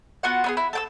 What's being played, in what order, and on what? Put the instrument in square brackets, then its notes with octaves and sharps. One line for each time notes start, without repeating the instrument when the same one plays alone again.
[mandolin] B3 F4 F#4 F#5
B3 E4 G#4
E4
A4 G5 E6